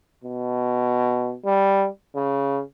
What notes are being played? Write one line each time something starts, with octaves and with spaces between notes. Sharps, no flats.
B2
G3
C#3